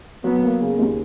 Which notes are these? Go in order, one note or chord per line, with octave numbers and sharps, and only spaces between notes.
F#3 B3
A#3
C#3
D#2